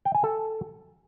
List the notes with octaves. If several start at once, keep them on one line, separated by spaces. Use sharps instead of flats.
G5
G#5
A4